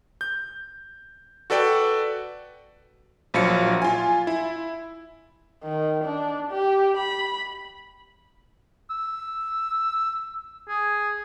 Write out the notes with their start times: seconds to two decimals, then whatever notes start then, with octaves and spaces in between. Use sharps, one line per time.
0.21 G6
1.50 F#4 A4 B4 D5 G5
3.34 A#1 F3 F#3 F5 C#7
3.82 F4 G#5
4.27 E4
5.64 D#3
6.05 D4
6.51 G4
6.97 B5
8.90 E6
10.69 G#4